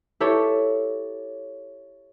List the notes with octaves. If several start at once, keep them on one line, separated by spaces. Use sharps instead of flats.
E4 G4 A4 C#5